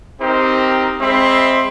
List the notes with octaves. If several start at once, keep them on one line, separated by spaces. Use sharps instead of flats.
C4 D#4 G4 A#4 C5
G#3 C4 E5 B5 C6